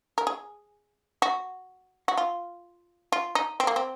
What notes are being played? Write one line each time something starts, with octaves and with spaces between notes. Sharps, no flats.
A#4
G#4
F#4
F#4
F4
F4
D#4
C4
A#3
C4